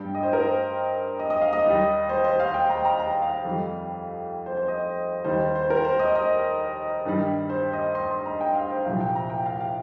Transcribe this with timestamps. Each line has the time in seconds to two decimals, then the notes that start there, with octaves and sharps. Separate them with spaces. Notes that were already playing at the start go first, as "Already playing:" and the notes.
Already playing: G2 G3 G5
0.15 D#5
0.23 C5
0.33 A#4
0.42 C5
1.19 D#5
1.30 D#5
1.42 F5
1.53 D#5
1.65 D#2 D#3 G3
2.09 C5
2.24 C5
2.40 F5
2.54 G5
2.70 A#5
2.77 G5
2.85 A#5
2.99 A#5
3.22 F5
3.45 F2 D#3 G3
4.46 C5
4.57 C5
4.68 D#5
5.24 D#2 D#3 G3 C5
5.40 C5
5.55 C5
5.70 A#4
5.85 C5
5.99 D#5
6.15 D#5
7.05 G2 D#3 G3
7.50 C5
7.73 D#5
7.95 C6
8.11 C6
8.26 A#5
8.41 G5
8.55 F5
8.70 C5
8.85 C2 A#2 F3 F5
9.01 G5
9.15 A#5
9.30 G5
9.46 F5
9.60 F5